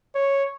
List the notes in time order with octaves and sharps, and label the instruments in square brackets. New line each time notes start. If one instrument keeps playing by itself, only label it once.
[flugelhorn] C#5